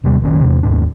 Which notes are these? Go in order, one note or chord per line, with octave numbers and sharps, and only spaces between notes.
E1 D#2 C3 G3
F1 A#1 D#3 C#4
E2 C3
D#1 D#2 G#2 D4